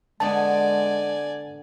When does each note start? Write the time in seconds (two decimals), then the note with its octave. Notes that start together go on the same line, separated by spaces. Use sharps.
0.20 D3 G#3 B3 D5 G#5 A5